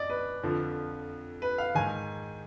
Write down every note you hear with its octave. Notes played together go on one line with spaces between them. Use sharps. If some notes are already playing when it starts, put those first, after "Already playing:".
Already playing: F#2 D5 D#5
B4
F2 D3 F3
B4
F5
G#2 D#3 G#5